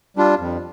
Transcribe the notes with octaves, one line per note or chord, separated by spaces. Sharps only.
G3 D4 F4
F2